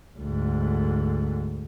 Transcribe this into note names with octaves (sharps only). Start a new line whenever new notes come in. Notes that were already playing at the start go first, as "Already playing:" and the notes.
D2 G#2